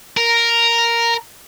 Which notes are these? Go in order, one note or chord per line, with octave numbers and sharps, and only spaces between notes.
A#4